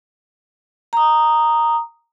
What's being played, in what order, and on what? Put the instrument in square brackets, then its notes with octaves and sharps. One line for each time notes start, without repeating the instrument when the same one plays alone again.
[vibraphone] A#5 D#6